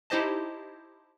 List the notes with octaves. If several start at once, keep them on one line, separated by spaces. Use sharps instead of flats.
D#4 E4 G4 C5 D#5 A5